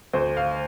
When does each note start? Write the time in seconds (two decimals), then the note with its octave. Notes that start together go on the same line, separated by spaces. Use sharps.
0.13 D2 C5
0.37 F5